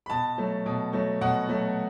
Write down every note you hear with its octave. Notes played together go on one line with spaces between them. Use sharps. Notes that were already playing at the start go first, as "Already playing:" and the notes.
B5
B2 A5
F#3 A3
B2
F#3 A3
B2 F#5
F#3 A3